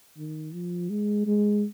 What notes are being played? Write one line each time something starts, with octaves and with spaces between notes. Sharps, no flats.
D#3
F3
G#3
G#3